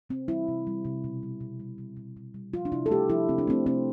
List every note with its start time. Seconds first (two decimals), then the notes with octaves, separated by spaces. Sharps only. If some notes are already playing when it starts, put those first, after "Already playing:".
0.10 C3 C4
0.28 G3 E4
0.48 C3
0.67 G3
0.85 C3
1.04 B2
1.23 G3
1.41 B2
1.60 G3
1.78 G3
1.97 B2
2.17 B2
2.34 G3
2.54 F3 F4
2.65 D4
2.72 C3 E4
2.86 A4
2.91 A3 G4
3.09 F3 E4
3.29 C3 C4
3.38 D4
3.47 A3 C4
3.66 C3 C4